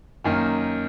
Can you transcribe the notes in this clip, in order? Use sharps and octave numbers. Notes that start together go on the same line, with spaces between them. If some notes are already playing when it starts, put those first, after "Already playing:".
F#2 D#3 A#3 D#4